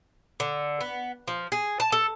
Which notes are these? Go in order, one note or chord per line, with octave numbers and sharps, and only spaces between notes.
D3
B3
F3
G#4
A5
A4